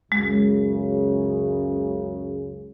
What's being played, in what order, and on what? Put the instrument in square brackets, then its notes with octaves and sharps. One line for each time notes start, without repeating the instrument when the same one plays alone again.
[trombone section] C#2 F#2 C#3 [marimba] G#3